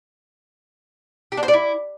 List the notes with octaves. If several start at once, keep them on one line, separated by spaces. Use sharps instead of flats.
G4
D4
C5
D5
E4